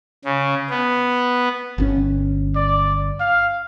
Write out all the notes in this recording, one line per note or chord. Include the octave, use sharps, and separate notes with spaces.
C#3
B3
G1 A#2 C#4
D5
F5